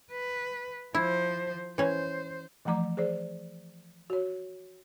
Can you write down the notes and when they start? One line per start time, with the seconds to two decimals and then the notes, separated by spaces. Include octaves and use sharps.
0.11 B4
0.95 F3 E4 C5
1.78 E3 C#4 C5
2.65 E3 F3 A3 A#5 D6
2.97 G#4 C5 D5
4.10 F#4 C#5